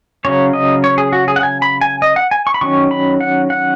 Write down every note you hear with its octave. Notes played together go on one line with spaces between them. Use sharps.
C#3 F#3 C#4 C#5
D#5
C#5
G#4
F#4
G#4
F#5
G#5
B5
G#5
D#5
F#5
G#5
C#6
B5
D#3 F#3 C#4 C#6
B5
F#5
F#5